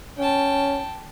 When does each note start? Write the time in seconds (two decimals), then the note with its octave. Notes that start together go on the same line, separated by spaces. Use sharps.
0.18 C#4 G5 A5